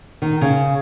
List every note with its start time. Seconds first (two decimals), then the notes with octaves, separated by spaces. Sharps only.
0.22 D#3
0.41 C#3